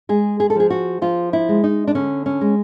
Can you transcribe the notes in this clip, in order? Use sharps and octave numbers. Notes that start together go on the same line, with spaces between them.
G#3 G#4
G#4
A4
F3 G#4
F#4
F3 F4
E4
G#3
D#4
D4
D3 C#4
C#4
G#3